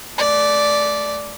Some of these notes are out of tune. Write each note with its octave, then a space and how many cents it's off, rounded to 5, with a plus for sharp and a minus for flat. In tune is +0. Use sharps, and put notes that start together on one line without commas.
A3 -30 D5 -5